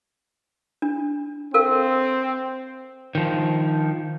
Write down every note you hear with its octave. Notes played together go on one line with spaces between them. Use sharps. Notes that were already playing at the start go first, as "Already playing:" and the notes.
D4
C4 A4 A#4 F5
D#3 F3